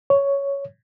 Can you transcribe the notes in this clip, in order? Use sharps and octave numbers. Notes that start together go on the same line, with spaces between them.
C#5